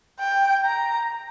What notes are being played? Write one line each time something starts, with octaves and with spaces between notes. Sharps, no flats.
G5
A#5